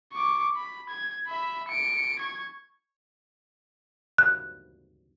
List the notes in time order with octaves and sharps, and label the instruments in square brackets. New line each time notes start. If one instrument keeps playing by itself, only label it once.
[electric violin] C#6 D6
B5
G#6
E5 B5
C#7 D7
C#6 G#6
[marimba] F#6